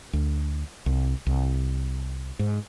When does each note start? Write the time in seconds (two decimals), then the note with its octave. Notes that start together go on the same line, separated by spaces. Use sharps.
0.13 D2
0.86 C2
1.27 C2
2.39 G#2